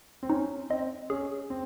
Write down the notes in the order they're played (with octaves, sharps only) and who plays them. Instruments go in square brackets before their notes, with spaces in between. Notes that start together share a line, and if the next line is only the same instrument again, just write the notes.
[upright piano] C4
[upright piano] C#4 [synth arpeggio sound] D#4
[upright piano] C4 [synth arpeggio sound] D#5
[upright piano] C#4 [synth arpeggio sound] G#4
[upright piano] C4